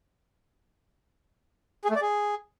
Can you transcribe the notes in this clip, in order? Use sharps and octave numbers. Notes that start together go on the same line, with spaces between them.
G#4
A3
D5
G#4